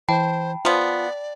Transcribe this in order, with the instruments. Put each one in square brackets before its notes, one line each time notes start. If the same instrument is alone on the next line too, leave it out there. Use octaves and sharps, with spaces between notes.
[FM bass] E3 [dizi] C5 [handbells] G5 A5 B5
[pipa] F3 B3 [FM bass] F4 [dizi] D5